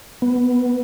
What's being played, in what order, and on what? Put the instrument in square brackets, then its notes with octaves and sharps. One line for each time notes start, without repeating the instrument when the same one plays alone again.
[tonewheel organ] B3